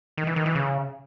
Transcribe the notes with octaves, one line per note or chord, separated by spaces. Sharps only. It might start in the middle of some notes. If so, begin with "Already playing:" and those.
D#3
E3
D#3
E3
C#3